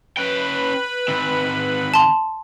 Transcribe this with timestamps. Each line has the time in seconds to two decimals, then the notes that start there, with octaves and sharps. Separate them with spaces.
0.17 C#4 B4 G5 B5
1.08 D#3 C4
1.94 A5 C6